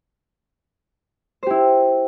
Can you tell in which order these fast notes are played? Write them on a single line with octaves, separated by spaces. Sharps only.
C5 G4 E4